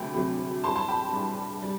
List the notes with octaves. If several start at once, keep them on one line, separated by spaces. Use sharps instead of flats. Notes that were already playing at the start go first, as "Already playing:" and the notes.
Already playing: D2 C3 F#3 A3 G5 B5
D2 C3 F#3 A3
G2 E3 G3 A5 C6
A5 C6
G5 B5
G2 E3 G3
G3